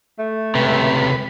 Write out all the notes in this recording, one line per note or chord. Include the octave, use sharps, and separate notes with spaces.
A3
C#2 C3 B4